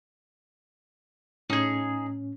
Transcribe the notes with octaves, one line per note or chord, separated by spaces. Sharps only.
A2 C#4 D#4 G#4